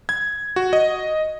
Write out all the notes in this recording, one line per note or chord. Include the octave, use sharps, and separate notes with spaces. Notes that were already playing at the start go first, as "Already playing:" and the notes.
G#6
F#4
D#5